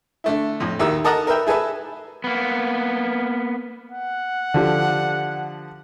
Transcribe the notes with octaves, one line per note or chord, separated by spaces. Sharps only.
D3 A3 E4
F2 A2
A#1 D#2 D#3 E4 D#6 E6
A4 A#4 D#5 F#5 A5 A#5
A#4 B4 E5 G5
E4 G#4 A4 B4 E5
A#3 B3
F#5
D3 F3 G4